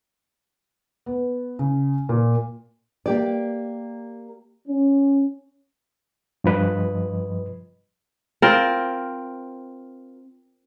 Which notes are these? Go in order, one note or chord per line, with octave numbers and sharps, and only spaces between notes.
B3
C#3
A#2
A#3 G4 D5
C#4
G2 F3 B4 D#5
C4 F4 A#4